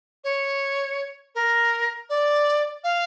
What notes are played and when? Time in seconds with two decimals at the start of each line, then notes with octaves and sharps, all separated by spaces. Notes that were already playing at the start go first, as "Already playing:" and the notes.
0.24 C#5
1.35 A#4
2.10 D5
2.84 F5